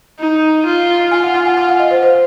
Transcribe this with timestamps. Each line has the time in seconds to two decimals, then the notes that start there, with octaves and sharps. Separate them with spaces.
0.19 D#4
0.66 F4
1.11 F4 G#5
1.23 F#5
1.34 F#5
1.45 G#5
1.57 F#5
1.69 F5
1.80 D#5
1.91 C5
2.03 C5